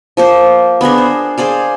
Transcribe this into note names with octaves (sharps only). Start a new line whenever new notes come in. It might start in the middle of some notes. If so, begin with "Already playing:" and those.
F3 A#3 C5
B3 D4 G#4 A#4
C5
G#4 C5 D5 F5